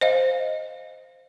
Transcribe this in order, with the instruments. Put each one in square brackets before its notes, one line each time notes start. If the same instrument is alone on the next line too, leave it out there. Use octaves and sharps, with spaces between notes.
[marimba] C5 D#5 F5